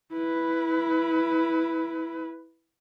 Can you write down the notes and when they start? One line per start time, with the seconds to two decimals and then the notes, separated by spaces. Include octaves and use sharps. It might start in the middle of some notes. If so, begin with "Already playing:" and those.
0.12 E4 B4